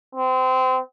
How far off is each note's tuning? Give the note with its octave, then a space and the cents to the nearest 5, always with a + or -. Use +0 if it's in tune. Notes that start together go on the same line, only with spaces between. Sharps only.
C4 -25